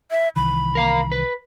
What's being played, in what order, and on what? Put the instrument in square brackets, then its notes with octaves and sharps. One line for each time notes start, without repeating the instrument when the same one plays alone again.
[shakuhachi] E5
[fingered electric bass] C2 D#3 E3 [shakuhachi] B5
[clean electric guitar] A#4 F5 A#5
B4